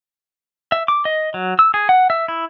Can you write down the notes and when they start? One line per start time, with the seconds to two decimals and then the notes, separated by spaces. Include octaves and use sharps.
0.72 E5
0.88 D6
1.05 D#5
1.34 F#3
1.59 E6
1.74 G#4
1.89 F#5
2.10 E5
2.28 E4